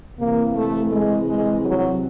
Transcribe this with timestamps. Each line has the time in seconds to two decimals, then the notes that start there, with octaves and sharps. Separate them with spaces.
0.18 C3 E3 A#3
0.55 A3
0.92 G#3
1.29 G#3
1.66 F#3